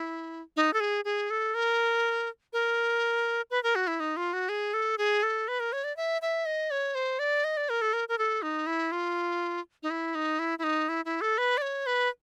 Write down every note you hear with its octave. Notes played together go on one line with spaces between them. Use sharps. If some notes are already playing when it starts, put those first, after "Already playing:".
Already playing: E4
D#4
A4
G#4
G#4
A4
A#4
A#4
B4
A#4
F#4
E4
D#4
F4
F#4
G#4
A4
G#4
A4
B4
A#4
C#5
D5
E5
E5
D#5
C#5
C5
D5
D#5
D5
A#4
A4
A#4
A#4
A4
D#4
E4
F4
D#4
E4
D#4
E4
E4
D#4
E4
E4
A4
B4
D5
C#5
B4